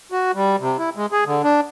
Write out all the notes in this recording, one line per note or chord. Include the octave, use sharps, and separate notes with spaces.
F#4
G3
C3
E4
G#3
G#4
D3
D4